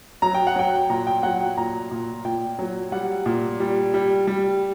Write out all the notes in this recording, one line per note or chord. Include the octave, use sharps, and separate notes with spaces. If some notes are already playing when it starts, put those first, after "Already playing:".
F#3 A#5
G5
F#5
F#3 G5
A#2 A#5
G5
F#3 F#5
G5
A#2 A#5
A#2
A#2 G5
F#3
G3 F#5
A#2
G3
G3
G3